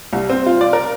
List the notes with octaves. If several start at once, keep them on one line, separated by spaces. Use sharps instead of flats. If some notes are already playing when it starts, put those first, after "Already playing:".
C2
C4
F4
D5
A#4